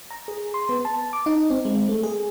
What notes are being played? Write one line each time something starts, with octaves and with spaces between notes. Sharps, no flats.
A#5
G#4
C6
B3
A5
D6
D#4
C4
G#3
A3
G#4